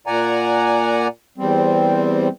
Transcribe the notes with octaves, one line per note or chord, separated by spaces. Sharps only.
A#2 D5 F#5 G#5 A#5
E2 G3 C4